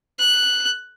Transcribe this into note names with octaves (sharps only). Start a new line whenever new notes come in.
F#6